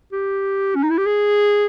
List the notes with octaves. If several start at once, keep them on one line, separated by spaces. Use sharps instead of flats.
G4
C#4
D#4
E4
G4
G#4